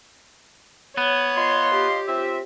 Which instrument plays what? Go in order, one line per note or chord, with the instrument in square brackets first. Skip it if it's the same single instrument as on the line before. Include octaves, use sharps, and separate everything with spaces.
[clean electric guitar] B3 [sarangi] C#5
[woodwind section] F4 D#5 C6
[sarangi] G4
[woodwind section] C4 F4 E5